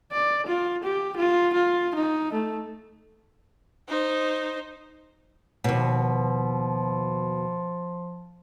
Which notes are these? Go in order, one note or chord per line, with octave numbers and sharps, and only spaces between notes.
D5
F4
G4
F4
F4
D#4
A3
D#4 C5
D#2 B2 F3